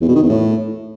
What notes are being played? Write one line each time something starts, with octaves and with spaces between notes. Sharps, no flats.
E2
B2
D#3
E2
A2